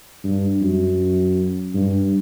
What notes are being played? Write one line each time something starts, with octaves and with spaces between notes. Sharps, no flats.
G2
F#2
G2